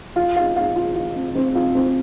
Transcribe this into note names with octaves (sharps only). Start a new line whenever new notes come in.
F4
F5
F5
F4
F4
C4
C4
F4
C4